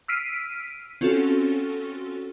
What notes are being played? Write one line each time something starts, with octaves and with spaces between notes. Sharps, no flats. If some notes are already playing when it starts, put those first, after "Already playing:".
E6 F6 B6 C7 D7 D#7
C4 C#4 F4 F#4 A4